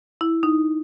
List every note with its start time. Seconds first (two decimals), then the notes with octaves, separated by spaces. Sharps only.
0.21 E4
0.43 D#4